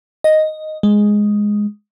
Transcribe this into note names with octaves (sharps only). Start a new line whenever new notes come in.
D#5
G#3